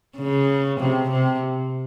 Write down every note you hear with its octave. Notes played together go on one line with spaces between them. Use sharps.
C#3
C3
C3